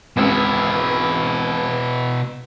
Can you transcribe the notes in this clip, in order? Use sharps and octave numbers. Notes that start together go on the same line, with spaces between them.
G#1 C#2 B2 E4